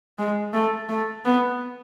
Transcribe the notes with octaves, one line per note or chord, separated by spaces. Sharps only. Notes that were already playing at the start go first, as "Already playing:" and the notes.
G#3
A3
A3
B3